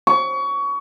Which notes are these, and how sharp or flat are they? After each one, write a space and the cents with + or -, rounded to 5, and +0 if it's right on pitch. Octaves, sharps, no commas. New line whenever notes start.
C#6 +25